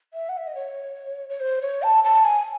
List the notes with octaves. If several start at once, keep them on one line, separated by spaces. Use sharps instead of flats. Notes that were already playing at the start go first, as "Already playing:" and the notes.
E5
F#5
E5
D#5
C#5
C#5
C5
C#5
A5
A5
G#5